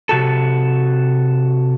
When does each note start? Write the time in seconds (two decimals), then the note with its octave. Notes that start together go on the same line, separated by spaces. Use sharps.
0.09 C3 F#4 A4